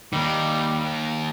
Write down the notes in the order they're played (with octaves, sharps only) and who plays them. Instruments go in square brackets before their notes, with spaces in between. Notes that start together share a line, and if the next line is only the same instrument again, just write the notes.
[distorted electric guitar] D#3 A#3 [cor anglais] G3